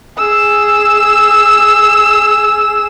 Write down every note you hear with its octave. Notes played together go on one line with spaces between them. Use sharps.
G#4 E6